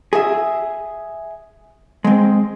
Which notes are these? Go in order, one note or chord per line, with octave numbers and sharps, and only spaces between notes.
G#4 E5
G#3 C4